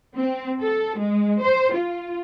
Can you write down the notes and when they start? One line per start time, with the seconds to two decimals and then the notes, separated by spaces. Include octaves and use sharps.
0.16 C4
0.62 A4
0.99 G#3
1.42 C5
1.74 F4